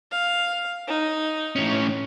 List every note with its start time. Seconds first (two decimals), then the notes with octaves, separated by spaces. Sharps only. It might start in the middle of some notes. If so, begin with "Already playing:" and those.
0.12 F5
0.88 D#4
1.56 A2 C#4